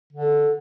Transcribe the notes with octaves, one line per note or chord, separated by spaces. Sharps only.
D3